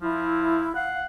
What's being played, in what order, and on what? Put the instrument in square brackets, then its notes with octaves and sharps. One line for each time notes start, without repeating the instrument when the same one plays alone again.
[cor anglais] F3 [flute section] E4
[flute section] F5 [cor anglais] F#5